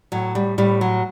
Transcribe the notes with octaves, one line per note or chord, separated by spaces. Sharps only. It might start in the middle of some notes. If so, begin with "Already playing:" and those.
A2 F#3
G3
A2 G3
F#3